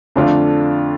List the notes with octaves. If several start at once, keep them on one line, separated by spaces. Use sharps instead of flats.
F2 D3 A3 D4 F4